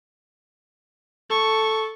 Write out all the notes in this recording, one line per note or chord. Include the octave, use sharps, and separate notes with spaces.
A4 C#6